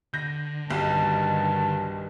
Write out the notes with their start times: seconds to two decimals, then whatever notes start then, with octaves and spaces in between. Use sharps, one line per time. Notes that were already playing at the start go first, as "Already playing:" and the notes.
0.14 D3 G6 A#6
0.70 F#1 B1 G2 D#3 G3 A5